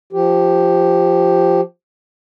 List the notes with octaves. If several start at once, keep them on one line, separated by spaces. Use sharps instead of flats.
F3 G4